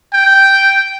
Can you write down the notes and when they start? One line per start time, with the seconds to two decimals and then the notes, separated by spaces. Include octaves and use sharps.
0.13 G5